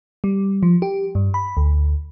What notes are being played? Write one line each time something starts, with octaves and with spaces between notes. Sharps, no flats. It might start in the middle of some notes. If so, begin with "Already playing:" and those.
G3
F3
G4
G2
B5
D2